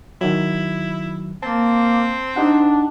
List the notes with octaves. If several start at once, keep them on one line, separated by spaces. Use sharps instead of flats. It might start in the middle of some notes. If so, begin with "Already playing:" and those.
D#3 F#3 E4
A#3 C4 A5
D4 D#4 G4 F#5